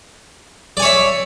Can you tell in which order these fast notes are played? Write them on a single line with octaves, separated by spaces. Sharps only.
D5 G#5 C#5 E5